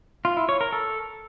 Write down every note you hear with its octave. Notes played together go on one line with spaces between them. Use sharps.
F4
E4
C#5
A#4
A4